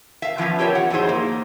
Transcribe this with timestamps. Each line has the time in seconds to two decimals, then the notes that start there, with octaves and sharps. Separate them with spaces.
0.22 E5 F5
0.38 E3 F3 B3 C#4
0.59 F4 G4 A#4 C5 C#5 E5
0.75 F#5
0.90 F2 E3 F#3 D#4 G#4 C5
1.09 A#3